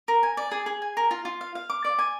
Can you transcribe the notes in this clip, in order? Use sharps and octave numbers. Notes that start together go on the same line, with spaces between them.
A#4
G#5
D5
G#4
G#4
G#5
A#4
F4
F4
F5
F5
D6
D5
G#5